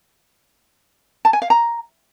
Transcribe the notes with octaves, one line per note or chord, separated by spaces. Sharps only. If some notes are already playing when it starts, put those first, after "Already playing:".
A5
G#5
F5
A#5